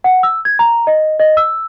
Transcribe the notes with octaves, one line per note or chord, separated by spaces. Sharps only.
F#5
E6
G#6
A#5
D#5
D#5
E6